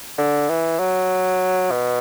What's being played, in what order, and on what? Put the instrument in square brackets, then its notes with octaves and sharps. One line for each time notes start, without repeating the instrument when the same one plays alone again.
[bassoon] D3
E3
F#3
B2